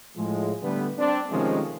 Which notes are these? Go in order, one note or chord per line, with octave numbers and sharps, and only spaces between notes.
A2 F3 G#3
D3 G3 A3 B3
C4 D4
C3 D#3 F3 G#3 A3 C#4